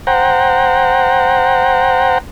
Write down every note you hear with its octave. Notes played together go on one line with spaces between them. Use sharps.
C5 F#5 G5 A#5